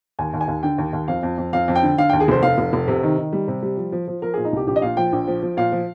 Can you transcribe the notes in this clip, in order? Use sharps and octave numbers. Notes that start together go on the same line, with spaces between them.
D#2 G#5
D#2
G#5
D#2
D3 G5
D#2
D#2
F2 F5
F2
F2
F2 F5
F2
G5
D3
D3 F5
D#2 G5
G#4
F1 C5
F1 F5
F1
F1
C3
D#3
D#3
G3
C3
G3
F3
F3
F3
F3 A#4
A#2 G#4
D#4
C2 G4
A#1 G4
D#5
A#2 F5
F3 G5
A#1
F3
F3
A#2 F5
F3